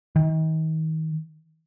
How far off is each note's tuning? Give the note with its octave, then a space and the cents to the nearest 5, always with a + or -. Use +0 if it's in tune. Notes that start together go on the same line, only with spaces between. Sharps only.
D#3 +35